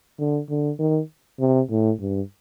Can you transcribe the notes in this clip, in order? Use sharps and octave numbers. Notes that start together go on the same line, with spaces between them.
D3
D3
D#3
C3
A2
G2